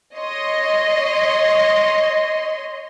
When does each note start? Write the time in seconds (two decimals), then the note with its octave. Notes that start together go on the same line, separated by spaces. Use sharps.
0.15 C#5 D#5 C6